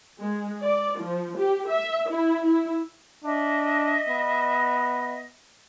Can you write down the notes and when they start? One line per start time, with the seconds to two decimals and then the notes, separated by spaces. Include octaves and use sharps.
0.19 G#3
0.62 D5
0.98 F3
1.38 G4
1.70 E5
2.10 E4
2.45 E4
3.24 D4 D#5 E5
4.08 B3